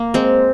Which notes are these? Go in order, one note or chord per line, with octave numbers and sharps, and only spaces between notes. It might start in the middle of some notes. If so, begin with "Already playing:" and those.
Already playing: A#3
G#3 C4